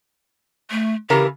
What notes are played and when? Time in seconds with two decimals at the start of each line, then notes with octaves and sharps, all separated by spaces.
0.71 A3
1.10 C#3 E3 G4 A#4